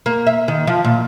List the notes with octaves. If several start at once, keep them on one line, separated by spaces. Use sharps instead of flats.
A#3
E5
D#3
F3
A#2